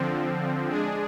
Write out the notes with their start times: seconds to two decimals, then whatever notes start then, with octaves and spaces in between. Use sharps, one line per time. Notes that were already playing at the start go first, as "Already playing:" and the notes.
Already playing: D3 F3 C4
0.68 G#3 D4 G#4